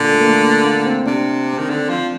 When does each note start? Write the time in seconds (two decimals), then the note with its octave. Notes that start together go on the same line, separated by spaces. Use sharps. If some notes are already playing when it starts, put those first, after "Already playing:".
Already playing: A#2 D3
0.13 A3
0.21 A#3
0.28 A3
0.44 A#3
0.65 A#3
0.86 C4
1.06 C3 D4
1.54 C4
1.59 D#3
1.70 D3
1.89 F3